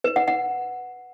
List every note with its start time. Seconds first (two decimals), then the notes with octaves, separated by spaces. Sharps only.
0.04 B4
0.16 F#5
0.28 F#5